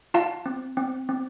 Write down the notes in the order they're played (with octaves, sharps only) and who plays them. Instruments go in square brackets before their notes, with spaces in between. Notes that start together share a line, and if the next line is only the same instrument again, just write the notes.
[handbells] F4 F5 A5
C4
C4
C4